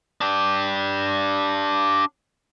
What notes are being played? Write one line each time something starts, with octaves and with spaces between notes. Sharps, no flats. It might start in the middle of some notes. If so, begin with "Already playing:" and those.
D4 G4